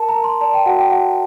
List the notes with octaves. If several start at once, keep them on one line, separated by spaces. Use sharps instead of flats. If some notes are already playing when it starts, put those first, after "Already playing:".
Already playing: A#4 A5
A#5
A#4
C6
D5 A5
G5
F#4 F#5
G5
F#4 F#5